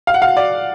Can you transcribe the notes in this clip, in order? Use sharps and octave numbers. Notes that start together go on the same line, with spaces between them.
F5
F#5
F5
D5